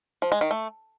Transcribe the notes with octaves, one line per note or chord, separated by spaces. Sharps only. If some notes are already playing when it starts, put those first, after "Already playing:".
F3
G#3
D#3
A3